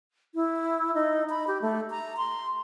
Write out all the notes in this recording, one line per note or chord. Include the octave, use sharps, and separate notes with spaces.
E4
D#4
B5
G4
A3
A#5
C6